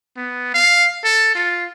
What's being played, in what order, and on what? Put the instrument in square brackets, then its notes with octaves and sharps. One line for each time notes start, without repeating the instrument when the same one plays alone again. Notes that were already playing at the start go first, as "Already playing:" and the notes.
[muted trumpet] B3
F5
A4
F4